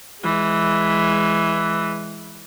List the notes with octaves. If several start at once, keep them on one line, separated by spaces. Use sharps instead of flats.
E3 G#3